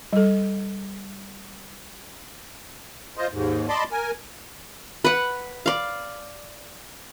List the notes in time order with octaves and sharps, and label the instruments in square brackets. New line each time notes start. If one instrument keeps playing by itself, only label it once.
[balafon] G3 A4
[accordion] F4 C5 D#5
D#2 G#2
D5 D#5 A5 B5 C6 D6
A#4 G#5
[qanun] B4 F#5
D5 F5